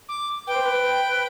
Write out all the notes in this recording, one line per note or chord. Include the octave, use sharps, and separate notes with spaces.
D6
B4 G5
C5
B4